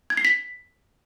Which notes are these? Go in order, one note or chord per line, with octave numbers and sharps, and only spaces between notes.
G#6
C7
B6